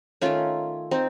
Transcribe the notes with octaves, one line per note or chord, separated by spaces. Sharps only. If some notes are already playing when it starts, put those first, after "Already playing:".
D#3 A3 C#4 F4
C4 D#4